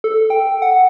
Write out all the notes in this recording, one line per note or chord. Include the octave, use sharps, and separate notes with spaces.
A4
G5
F#5